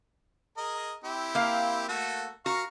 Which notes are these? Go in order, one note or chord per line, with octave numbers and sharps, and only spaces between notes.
G#4 A#4 D#5
C4 E4 G4
A#3 F5
A3 F#4 A4
F#4 A#4 F5 C#6